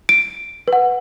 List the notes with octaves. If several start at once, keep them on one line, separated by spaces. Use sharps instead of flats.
D7
B4 F#5